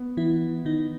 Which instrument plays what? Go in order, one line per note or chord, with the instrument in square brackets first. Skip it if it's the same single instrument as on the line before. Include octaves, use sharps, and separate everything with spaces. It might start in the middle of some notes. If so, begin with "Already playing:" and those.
Already playing: [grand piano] B3
[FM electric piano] E3 E4
D#3 D#4